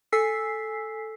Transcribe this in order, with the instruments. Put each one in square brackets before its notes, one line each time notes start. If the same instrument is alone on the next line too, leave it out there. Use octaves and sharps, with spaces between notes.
[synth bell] A4 G#5 E6 B6 C7